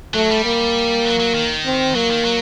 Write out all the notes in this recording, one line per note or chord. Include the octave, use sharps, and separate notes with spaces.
F#3 A3
G3
A#3
F#3
F#3
D#3
C4
F#3 A#3
D#3
F#3